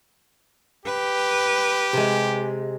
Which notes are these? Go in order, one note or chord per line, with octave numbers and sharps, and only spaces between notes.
G4 B4
C3 G#3